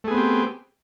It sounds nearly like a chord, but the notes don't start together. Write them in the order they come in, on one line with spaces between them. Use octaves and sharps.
A3 G#4 B3 C4 G4